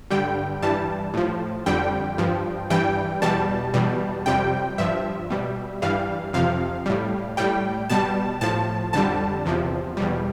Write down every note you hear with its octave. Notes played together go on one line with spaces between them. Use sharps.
G2 D3 G3 G5
G2 E3 G3 A5
A2 F3
F2 D3 G3 G5
G2 F3
G2 E3 G3 G5
E2 B2 G3 A5
E2 B2 G3
F2 C3 G3 G5
G2 F3 E5
B2 G3
G2 E3 G3 F5
F2 C3 F3 F5
A2 G3
A2 G3 G5
B2 G3 A5
A2 F3 A5
F2 D3 G3 A5
E2 C3 F3
E2 B2 G3